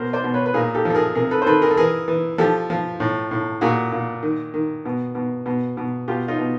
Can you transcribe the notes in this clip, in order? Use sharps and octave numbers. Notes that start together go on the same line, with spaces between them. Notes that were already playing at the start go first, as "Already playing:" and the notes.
Already playing: B2 A#4 C5
C5 D5
B2
B4 C#5
B4
A#2 G#4 A#4
G4 A4
F3
A4
G#4 A#4
C3 G#4 A#4
A4 B4
C5
D#3 A4 B4
G#4 A#4
A4
E3 G#4 A#4
E3
F3 G4 A4
F3
A2
A2
A#2 F#4 G#4
A#2
D#3
D#3
B2
B2
B2
B2
B2 F4 G4
D#4 F4
B2